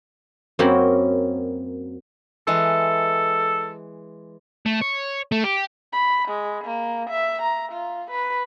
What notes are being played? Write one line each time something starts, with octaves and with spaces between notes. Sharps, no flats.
F#2 A#3 C4 C#4 F#4 B5
E3 G#3 A4 B4
A3
C#5
A3
G4
B5
G#3
A#3
E5
A#5
F4
B4